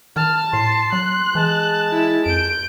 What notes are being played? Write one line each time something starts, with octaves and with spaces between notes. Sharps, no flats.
D#3 A5 F6
A2 C6 C7
F#3 F#6
E3 G#3 A5
E4
F2 G6 D7